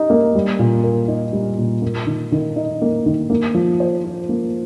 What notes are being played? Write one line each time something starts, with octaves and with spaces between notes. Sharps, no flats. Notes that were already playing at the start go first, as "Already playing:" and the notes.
Already playing: D#4 G4
A#3
G3
A#2
A#4
D#4
G3
A#2
A#3
D#3
D#3
D#4
A#3
D#3
A#3
F3
C5
F4
A#3